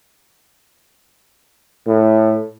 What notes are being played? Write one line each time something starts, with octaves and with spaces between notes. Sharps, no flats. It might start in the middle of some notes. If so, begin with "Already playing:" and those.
A2